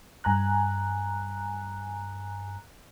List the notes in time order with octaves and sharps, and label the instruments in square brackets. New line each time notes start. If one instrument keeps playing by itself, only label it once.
[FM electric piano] G2 G#5 A#5 F#6